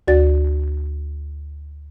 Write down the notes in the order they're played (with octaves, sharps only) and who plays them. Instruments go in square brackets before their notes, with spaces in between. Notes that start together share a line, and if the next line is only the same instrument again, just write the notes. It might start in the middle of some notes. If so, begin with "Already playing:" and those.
[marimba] D2 F#4 D5 A6